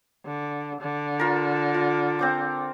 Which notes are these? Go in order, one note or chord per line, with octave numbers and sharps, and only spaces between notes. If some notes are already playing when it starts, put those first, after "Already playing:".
D3
D3
F4 A#4
F4
C4 C5 D6